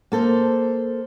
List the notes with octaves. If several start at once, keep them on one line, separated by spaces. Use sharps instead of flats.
A#3 A4 C5